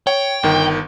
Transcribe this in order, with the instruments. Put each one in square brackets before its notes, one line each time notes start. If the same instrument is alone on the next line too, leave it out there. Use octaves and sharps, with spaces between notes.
[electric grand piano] C#5 [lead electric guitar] G5
[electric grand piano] G1 D#3